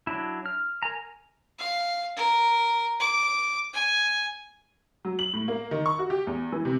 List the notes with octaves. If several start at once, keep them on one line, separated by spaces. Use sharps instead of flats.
F#3 D4 E4
F6
A#4 G#5 A#5
F5
A#4
D6
G#5
F#3
F#7
A2
A#3
D#3
C#6
F#4
G4
E2
E3
C3